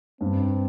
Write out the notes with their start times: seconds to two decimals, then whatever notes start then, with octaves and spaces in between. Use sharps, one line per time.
0.21 G2 C4